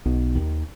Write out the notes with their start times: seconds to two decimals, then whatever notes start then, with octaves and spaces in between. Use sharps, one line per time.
0.06 B1 B2
0.35 D#2 D#3